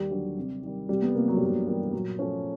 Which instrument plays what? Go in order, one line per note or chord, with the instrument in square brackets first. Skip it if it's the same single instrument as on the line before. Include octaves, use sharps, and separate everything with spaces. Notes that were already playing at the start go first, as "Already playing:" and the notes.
Already playing: [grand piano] D#2 [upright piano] G3
[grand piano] D3 F#3
C3
D#3 G3
[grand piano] C2 [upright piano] G3
[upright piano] B3
[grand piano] C3 F3 [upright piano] A#3
[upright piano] F#3
G3
[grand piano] G2 [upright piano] F#3
[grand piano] E3 G3 A#3
[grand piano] A#2 [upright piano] F#3
[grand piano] F3 A3 C#4